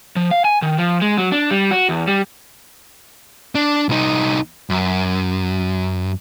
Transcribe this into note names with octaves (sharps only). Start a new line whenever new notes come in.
F3
F5
G#5
D#3
F3
G#3
F#3
D4
G3
F#4
E2
G3
D4
C2 D#4
F#2